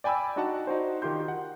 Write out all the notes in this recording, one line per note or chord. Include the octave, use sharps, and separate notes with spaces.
D5 G5 G#5 B5 D6 E6
D4 D#4 F#4 D5 F#5 A5
D#4 F#4 C5
D#3 F4 G4 C6 G6
F#5